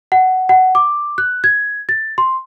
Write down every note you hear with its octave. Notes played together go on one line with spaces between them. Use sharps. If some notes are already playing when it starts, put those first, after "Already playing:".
F#5
F#5
D6
F#6
G#6
A6
C6